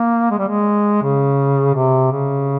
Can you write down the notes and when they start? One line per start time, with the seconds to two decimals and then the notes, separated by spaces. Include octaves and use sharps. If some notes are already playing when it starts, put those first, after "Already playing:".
Already playing: A#3
0.31 G#3
0.39 G3
0.48 G#3
1.03 C#3
1.75 C3
2.12 C#3